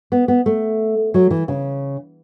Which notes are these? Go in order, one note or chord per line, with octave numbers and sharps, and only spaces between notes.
B3
B3
A3
F#3
E3
C#3